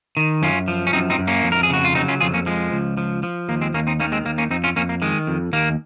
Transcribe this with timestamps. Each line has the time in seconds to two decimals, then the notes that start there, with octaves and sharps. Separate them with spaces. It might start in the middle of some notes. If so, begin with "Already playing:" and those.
0.17 D#3
0.42 F#2 C#4 F4
0.68 F3
0.87 C#4
0.93 F#2 C4 D#4
1.10 C4 D#4
1.19 F#2
1.27 A#3 C#4
1.44 F2
1.52 A#4
1.63 G#4
1.70 C#3 F#4
1.85 F4
1.95 F#3 C4 D#4
2.08 C#4 F4
2.21 F2 F4 G#4
2.34 A#3 C#4
2.46 F3 G#3
2.72 C#2
2.97 F3
3.23 F3
3.49 D#2 A#3
3.61 G#3 C4
3.74 D#2 A#3 C#4
3.87 C4 D#4
4.00 D#3 A#3 C#4
4.12 G#3 C4
4.25 D#2 A#3
4.38 A#3 C#4
4.51 F2 C4 D#4
4.64 C#4 F4
4.76 F2 A#3 C#4
4.89 A#3
5.02 D#3 G#3
5.27 F2
5.53 D#2 A#3